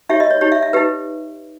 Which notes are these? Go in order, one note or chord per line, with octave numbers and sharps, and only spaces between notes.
D#4 G4 C#5 E5
D#5
C#5
D#4 G4 C#5
E5
E5
D#4 G4 B4